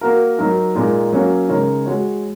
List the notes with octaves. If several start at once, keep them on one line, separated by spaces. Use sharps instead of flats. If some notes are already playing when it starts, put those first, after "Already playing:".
A#3 F#4 A#4
F#3 D#4 A#4
A#2 G#3 D#4
F#3 A#3 C#4 F#4 C#5
C#3 G#3 D#4 A#4 C#5
G#3 F#4 C#5